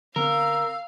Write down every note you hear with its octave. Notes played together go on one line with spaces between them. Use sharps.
D3 B3 C4 A#4 F5 E6